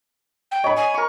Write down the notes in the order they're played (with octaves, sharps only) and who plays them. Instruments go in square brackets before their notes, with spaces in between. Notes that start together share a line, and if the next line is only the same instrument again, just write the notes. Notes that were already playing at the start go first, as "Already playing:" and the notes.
[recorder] G5
[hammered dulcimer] C#5 [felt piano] D#5 B5
[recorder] G#5
[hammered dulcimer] A#4 C#6